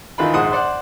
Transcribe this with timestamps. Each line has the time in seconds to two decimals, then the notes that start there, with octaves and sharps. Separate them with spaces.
0.18 G#1 D#3 E3 F4 B5
0.34 A#1 G#2 G#3 C5 F#5 D#6
0.52 C5 D5 F#5 C6